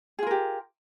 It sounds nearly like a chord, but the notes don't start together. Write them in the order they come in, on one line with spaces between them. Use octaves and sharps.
G#4 F4 A#4 G4